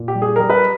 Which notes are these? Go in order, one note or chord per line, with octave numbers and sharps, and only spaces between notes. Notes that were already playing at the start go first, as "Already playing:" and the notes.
Already playing: A#2
G4
G3
G#4
G3 A#4
B4